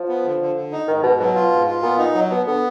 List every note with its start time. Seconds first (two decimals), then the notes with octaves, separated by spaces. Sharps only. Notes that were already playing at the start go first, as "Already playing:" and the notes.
Already playing: F3
0.08 B3
0.25 D3
0.41 D3
0.56 D3
0.72 D#4
0.87 G#2 D#3
1.03 G#2 B2
1.20 B2 F#3
1.35 F4
1.52 G#2
1.67 F4
1.83 A#2 B3
1.99 D#4
2.15 F#3
2.31 B2 B3
2.46 D3 B3